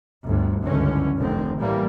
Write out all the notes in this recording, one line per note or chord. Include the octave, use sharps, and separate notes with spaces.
G1 D2 G2
G1 C#2 F#2 D3 E3 C#4
F1 D3 D#3 C4
A1 E3 G3 A#3